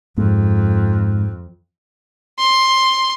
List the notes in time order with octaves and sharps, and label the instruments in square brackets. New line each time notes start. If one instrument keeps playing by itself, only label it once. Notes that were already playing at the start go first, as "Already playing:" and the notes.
[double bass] F2 [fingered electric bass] G#2
[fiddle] C6